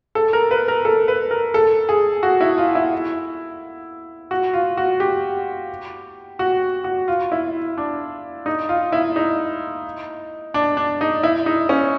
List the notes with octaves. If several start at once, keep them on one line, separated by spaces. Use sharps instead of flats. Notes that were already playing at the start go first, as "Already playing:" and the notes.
A4
A#4
B4
A#4
A4
B4
A#4
A4
G#4
F#4
E4
F4
E4
F#4
F4
F#4
G4
F#4
F#4
F4
E4
D4
D#4
F4
E4
D#4
D4
D4
D#4
E4
D#4
C#4